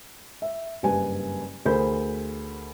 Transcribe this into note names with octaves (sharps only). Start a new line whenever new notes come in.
E5
F#1 G2 B4 G#5
D2 G#4 A#4 C5 B5 G6